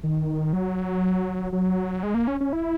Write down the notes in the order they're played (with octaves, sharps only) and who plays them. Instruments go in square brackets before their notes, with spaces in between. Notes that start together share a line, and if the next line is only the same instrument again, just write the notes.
[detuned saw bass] D#3
F#3
F#3
G#3
A#3
C#4
C#4
E4